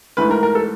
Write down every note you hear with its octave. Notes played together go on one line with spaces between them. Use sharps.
G#2 E3 A3 B4
A#4
A#4
A4